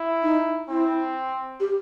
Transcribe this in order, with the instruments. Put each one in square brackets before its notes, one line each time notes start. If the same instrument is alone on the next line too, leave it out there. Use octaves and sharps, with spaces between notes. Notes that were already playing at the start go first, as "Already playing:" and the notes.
Already playing: [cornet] E4
[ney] D#4
[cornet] C4 [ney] E4
[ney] G4